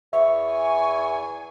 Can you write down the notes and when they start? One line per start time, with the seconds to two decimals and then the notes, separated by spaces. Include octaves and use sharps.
0.13 E2 E5 C#6
0.49 G#5